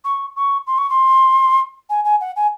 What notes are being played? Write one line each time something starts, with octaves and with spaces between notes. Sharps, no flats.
C#6
C#6
C6
C#6
C6
G#5
G#5
F#5
G#5